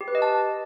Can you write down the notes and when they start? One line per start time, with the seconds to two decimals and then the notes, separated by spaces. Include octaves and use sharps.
0.01 G4
0.08 B4
0.15 D#5
0.22 A5